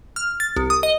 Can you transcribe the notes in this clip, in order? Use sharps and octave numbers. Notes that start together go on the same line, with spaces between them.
F6
A6
C2
D#6
D#5